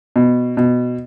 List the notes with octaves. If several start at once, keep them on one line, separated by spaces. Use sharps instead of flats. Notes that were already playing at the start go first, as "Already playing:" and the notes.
B2
B2